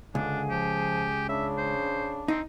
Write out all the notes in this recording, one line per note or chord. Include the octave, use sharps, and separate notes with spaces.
C#2 D3 D4 G#4
F3 G4
C#3 D4 E5
C5
C4 D#4